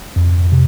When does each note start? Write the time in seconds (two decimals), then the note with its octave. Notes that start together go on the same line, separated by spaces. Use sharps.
0.16 F2
0.52 C3